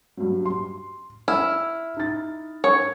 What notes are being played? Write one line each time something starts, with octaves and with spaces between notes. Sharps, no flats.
G2 F#3
C6
E4 F6
D#4 A6
C#5